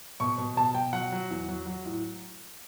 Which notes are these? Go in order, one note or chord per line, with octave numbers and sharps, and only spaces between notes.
B2 C#6
B2
B2 A5
B2 G5
F#3 F#5
F#3
E2
F#3
F#3
A2